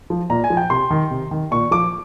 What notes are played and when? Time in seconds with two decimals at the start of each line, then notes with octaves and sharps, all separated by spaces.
0.10 F3
0.30 A#2 A#5
0.44 G#5
0.50 F3
0.57 G5
0.70 C3 C6
0.91 D#3
1.11 C3
1.31 D#3
1.51 A#2 C#6
1.71 F3 D6